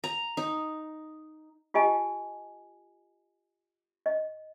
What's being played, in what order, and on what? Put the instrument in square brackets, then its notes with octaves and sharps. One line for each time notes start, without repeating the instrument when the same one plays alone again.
[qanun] A#5
D#4
[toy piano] F4 G4 D#5 G#5 A5
D#5